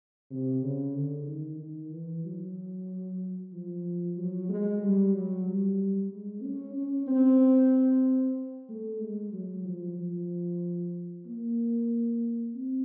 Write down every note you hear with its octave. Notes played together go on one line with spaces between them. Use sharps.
C3
C#3
D3
D#3
D#3
E3
F#3
F3
F#3
G#3
G3
F#3
G3
G#3
C#4
C#4
C4
A3
G#3
F#3
F3
F3
A#3
C4